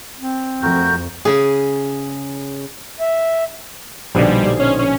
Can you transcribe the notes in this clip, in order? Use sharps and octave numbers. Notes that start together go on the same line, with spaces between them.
C4
F2 A3 F#4 A#4 G6
C#3 G#4
E5
A#1 B2 D3 G3 D#4 C5 G#5
C#4
C#4